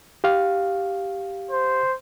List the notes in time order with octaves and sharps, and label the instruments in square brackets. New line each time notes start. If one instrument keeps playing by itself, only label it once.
[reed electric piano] G4 F5
[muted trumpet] C5